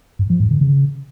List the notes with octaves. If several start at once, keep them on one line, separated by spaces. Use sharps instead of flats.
G2
F3
G#2
D3
C#3